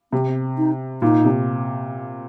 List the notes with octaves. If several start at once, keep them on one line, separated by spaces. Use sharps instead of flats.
C3 C4
D#4
A#2 D#4
C3